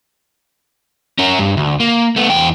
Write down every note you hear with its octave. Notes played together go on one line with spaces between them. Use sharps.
C#4 A#4
G2
D2
A#3
A3 B3
E2 G5